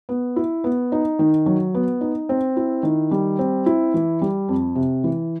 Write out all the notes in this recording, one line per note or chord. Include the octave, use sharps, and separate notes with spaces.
B3
E4
B3
D#4
D#3
F#3
B3
D#4
C4
E4
D#3
G3
C4
E4
E3
G3
F2
C3
E3